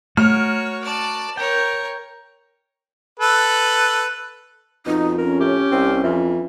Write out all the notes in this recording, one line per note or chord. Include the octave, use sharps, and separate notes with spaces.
A3 F#4 A#4 C#5 F6
D5 A5
A#4 C#5 G5
A4 B4
F2 B2 D#4
C#4 A#4
A2 G4
C2 C4
F2 E3